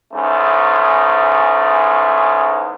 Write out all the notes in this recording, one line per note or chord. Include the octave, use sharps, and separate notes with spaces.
E2 G#2 A3 C#4